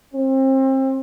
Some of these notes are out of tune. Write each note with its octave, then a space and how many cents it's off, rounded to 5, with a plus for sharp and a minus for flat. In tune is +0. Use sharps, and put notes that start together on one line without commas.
C4 +30